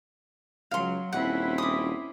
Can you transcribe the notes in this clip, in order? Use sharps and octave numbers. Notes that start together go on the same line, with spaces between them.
C#2 F#3 F5 C6
D#1 C4 C#4 E4 F#5
D6 D#6